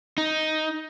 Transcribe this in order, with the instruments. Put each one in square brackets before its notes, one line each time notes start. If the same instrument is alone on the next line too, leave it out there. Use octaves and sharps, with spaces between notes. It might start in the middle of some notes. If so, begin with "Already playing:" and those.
[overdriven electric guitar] D#4